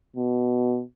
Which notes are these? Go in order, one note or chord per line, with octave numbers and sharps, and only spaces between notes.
B2